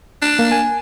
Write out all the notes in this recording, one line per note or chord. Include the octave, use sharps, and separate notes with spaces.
D4
A#3
G#5